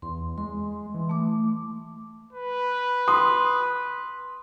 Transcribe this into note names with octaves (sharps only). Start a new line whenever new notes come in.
E2 C6
G#3 C6
E3
A3 D6
B4
C6 D#6